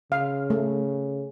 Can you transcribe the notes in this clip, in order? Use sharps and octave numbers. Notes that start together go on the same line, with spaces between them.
C#3 F5
A3